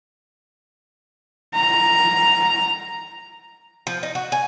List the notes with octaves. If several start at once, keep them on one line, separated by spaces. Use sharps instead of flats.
A#5
F3
D#4
F#4
G#5